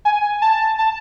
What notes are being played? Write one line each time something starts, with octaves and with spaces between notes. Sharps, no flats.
G#5
A5
A5